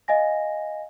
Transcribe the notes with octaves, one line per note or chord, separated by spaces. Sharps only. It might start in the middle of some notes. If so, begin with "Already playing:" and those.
D#5 F5 G#5 A#6